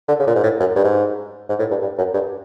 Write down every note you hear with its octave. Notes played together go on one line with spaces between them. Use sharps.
D3
C#3
A#2
G#2
A2
F#2
G2
G#2
G#2
A2
G2
G2
F#2
G2